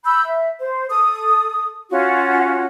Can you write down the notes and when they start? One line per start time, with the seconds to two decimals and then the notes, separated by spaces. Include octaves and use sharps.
0.05 B5 E6 G6
0.24 E5
0.59 C5
0.90 A4 D#6
1.90 C#4 F4 F#4